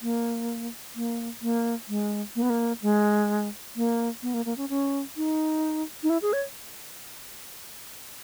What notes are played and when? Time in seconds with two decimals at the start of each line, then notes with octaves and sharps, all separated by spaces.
0.02 A#3
0.96 A#3
1.42 A#3
1.89 G#3
2.36 A#3
2.42 B3
2.50 A#3
2.82 G#3
3.76 A#3
4.22 B3
4.34 A#3
4.45 A#3
4.57 C#4
4.69 C#4
5.17 D#4
6.03 D#4
6.10 E4
6.22 G#4
6.33 C#5